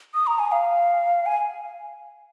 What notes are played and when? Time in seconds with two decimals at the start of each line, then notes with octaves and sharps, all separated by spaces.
0.14 D#6
0.27 A#5
0.39 G#5
0.52 F5
1.26 G#5